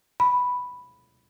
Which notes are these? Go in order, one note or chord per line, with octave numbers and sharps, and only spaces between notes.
B5